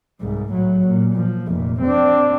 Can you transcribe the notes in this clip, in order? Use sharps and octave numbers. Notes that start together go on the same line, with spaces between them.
C2 G#2
A2 F#3
A#2
F3
F1 A#2
C4 D4